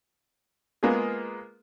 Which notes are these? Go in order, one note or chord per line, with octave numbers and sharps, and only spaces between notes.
G#3 A#3 B3 F4 G#4